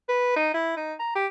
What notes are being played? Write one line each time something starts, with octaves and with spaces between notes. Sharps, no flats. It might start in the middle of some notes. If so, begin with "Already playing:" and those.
B4
D#4
E4
D#4
A#5
G4